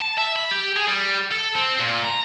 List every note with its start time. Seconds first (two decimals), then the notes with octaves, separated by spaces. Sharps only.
0.01 A5
0.18 E5
0.36 B5
0.51 G4
0.76 G#4
0.88 G3
1.32 A4
1.56 C4
1.80 A#2
2.05 A#5